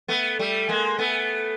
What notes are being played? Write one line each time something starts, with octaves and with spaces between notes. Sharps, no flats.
A3 B3
G3 A3
G#3 A#3
A3 B3